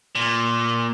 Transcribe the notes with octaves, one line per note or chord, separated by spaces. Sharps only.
A#2